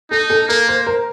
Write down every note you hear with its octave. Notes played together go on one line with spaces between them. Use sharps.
D#4 A4
A4
A#3 A#4
C5
A#4